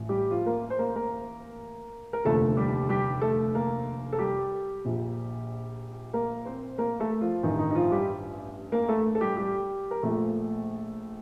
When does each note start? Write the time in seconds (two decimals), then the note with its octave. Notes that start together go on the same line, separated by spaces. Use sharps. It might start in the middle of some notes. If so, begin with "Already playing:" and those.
Already playing: A1 A2 F3
0.09 G3 G4
0.31 F3 F4
0.46 A#3 A#4
0.70 C5
0.79 A#3 A#4
0.96 A#3 A#4
2.13 A#4
2.24 F1 D#2 D3 F3 A3 A4
2.57 G3 G4
2.89 G3 G4
3.22 A3 A4
3.55 A#3 A#4
4.13 A4
4.19 G3 G4
4.85 A#1 A#2 F3
6.13 A#3 A#4
6.45 C4 C5
6.78 A#3 A#4
7.00 A3 A4
7.21 F3 F4
7.43 A1 G2 D#3 D#4
7.59 D#3 D#4
7.70 D#4
7.75 F3 F4
7.92 G3 G4
8.72 A#3 A#4
8.88 A3 A4
9.15 A4
9.21 G3 G4
9.37 G3 G4
9.91 A#4
10.02 A#1 A#2 F3 A3 A4